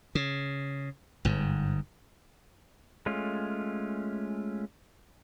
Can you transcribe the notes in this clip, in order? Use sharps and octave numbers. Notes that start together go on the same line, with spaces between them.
C#3
G1 G#2
G#3 A3 C#4 F4